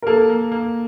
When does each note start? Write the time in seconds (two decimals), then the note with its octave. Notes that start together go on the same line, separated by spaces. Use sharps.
0.02 A#4
0.07 A#3 A4
0.30 A#3
0.52 A#3